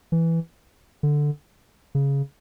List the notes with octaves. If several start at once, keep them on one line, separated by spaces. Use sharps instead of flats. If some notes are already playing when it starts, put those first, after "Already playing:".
E3
D3
C#3